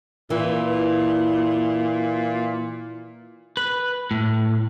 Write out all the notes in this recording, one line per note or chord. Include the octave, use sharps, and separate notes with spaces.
A#2 E3
B4
A2